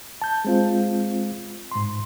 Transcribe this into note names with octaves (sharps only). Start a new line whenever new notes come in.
A5 G6
G#3 C4 F4
G#2 C6